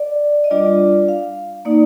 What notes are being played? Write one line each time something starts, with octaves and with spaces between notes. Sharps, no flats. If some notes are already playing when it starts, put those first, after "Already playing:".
Already playing: D5
D#5
G3 D4 F4 D5
F5
A#3 D#4 D5